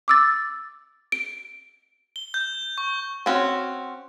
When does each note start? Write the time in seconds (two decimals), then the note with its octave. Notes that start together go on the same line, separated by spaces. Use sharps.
0.08 D6 E6 A6
1.12 D7
2.16 G7
2.34 G6
2.78 C#6
3.26 C4 C#4 F#4